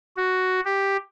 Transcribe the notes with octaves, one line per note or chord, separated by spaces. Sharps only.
F#4
G4